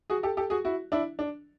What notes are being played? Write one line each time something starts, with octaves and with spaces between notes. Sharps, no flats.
F#4 G#4
G4 A4
G4 A4
F#4 G#4
E4 F#4
D4 E4
D4